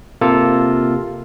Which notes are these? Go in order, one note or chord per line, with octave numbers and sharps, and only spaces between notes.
C3 A#3 F4 A4